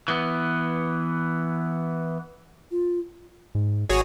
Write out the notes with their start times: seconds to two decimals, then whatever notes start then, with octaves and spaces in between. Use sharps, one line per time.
0.08 E3 B3
2.71 F4
3.55 G#2
3.89 G#1 F#4 G#4 C#5